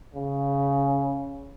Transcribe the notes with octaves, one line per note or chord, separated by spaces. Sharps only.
C#3